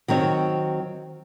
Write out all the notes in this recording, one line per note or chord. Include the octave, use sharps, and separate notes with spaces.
D#3 F#3 C4 C#5